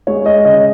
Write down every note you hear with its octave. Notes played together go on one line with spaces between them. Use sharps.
G#3 C#5
D#5
C#3 D#5